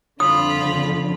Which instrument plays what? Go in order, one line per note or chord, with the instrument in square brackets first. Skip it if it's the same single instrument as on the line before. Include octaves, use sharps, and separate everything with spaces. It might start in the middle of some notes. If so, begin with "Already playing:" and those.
[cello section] F2 D3 [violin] F4 B5 [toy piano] D#6